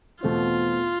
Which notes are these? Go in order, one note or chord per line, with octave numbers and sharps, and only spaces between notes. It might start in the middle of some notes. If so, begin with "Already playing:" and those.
E2 B2 A3 C4 F4